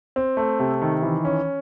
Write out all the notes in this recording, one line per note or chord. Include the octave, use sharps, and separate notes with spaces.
C4
A3
C3
D#3
E3
C#4